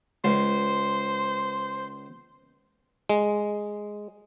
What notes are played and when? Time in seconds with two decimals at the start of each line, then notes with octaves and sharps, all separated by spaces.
0.24 C#2 C5
3.10 G#3